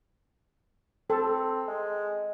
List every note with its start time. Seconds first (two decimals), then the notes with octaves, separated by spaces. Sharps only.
1.10 C4 A4
1.68 G#3